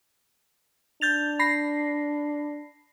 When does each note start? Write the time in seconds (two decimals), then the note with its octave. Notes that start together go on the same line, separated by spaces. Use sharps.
1.01 D4 G6 A6 F7
1.39 B5 A#6 C7